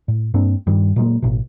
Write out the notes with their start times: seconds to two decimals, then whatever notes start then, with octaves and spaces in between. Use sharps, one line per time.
0.08 A2
0.34 G2 A#3 C4 D4
0.67 G2 D#3
0.96 A#2 F#3 G#3 A#3
1.22 A1 B2